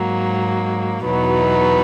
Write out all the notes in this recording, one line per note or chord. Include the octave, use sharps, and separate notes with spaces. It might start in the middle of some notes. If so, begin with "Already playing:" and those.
Already playing: G#2 F#3 A#3
E2 B2 F#3 B3 D#4